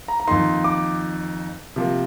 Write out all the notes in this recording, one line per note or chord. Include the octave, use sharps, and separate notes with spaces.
A#5
A#5
F2 D#3 A#3 D#4 C6
D6
C3 F3 A#3